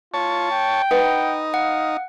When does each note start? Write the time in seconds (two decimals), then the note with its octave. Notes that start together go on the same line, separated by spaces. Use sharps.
0.14 F4 C#5 A5
0.52 G5
0.91 D#4 B4 F#5
1.54 F5 F#5